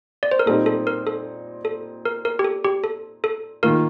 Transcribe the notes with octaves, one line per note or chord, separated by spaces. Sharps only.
D5
C5
A#4
A#2 G3 C4 D#4 A4
A4
A#4
A4
A4
A#4
A#4
G4
A4
G4
A4
A4
D#3 A#3 F4 A#4